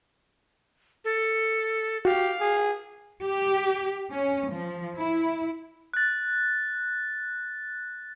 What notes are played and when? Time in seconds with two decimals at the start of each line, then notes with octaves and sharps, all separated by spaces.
1.05 A4
2.05 F#4 G4 F5
2.40 G#4
3.23 G4
4.11 C#4
4.52 F3
4.96 E4
5.94 F#6 A6